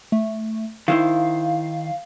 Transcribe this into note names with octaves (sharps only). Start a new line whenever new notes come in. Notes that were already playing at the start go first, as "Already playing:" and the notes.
A3
D#3 E4 C5 F5